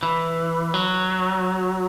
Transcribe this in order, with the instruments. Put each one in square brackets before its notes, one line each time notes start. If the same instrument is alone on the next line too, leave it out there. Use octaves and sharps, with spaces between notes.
[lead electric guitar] E3
F#3